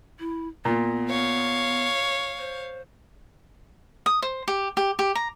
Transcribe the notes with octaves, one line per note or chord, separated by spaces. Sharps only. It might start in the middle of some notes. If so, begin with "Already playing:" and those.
E4
A#2 B3
C#5 F5
C5
D#6
C5
G4
G4
G4
A#5